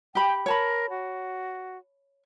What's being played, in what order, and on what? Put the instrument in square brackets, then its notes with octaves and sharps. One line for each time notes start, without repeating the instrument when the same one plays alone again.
[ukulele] G4 B5 [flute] G5
[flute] A#4 [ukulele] C#5 A5 B5
[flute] F#4